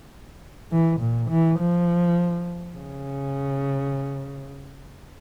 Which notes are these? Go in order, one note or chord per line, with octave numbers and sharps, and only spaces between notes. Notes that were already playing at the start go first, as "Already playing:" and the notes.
E3
A#2
E3
F3
C#3